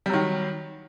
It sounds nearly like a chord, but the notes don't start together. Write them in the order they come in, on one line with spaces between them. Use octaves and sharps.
G3 F#3 D#3